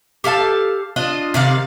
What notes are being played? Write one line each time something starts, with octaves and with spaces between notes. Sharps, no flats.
G4 A4 F5 A5
D4 F4 D#5
C3 D#3 D5 F5